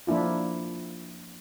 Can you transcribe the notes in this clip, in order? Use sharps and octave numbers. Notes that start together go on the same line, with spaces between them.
F3 A#3 D4 E4 F4